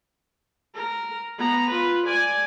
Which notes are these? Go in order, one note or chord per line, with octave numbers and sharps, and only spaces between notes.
A#4
B3 A#5
F4 B4
D5 G#5